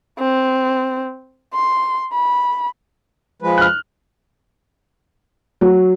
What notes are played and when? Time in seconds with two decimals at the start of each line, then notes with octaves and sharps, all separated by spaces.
0.19 C4
1.54 C6
2.13 B5
3.42 F3 G#3 B4
3.58 F6 F#6
5.61 F#3